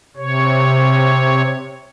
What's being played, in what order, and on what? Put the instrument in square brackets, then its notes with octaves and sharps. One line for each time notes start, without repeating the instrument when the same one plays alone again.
[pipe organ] C3 C#5